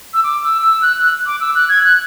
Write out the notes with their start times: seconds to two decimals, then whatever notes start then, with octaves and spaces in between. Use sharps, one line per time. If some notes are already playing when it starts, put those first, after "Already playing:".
0.14 E6
0.23 D6
0.44 E6
0.63 E6
0.82 F#6
0.97 F#6
1.26 D6
1.40 E6
1.55 F#6
1.69 G#6
1.83 F#6